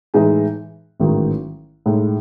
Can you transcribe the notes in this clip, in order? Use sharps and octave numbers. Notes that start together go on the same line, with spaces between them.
A2 E3 G#3 D#4 G#4
A1 G#2 D#3 F#3
A2 G#3 D#4